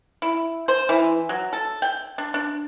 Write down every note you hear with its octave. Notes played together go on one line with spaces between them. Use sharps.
E4
C5
E3
F#3
A4
G5
D4
D4